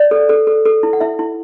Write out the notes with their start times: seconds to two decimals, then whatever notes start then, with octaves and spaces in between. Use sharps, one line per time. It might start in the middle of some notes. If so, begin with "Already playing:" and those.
Already playing: C#5 D5
0.11 A4
0.29 A4
0.47 A4
0.65 A4
0.83 E4
0.93 F#5
1.00 E4 E5
1.19 E4